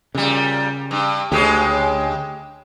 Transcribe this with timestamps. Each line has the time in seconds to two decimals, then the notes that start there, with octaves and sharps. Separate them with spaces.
0.15 A#2 C#3 G3
0.91 G2
1.32 D2 C#3 G#3 G4